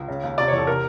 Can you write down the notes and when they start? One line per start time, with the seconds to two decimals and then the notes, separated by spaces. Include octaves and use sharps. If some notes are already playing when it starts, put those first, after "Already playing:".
Already playing: C#2
0.08 C#3
0.23 D#2
0.38 C3 D5
0.48 C#5
0.52 E2
0.58 A4
0.67 C3 A#4